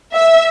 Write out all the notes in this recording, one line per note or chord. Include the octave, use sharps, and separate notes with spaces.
E5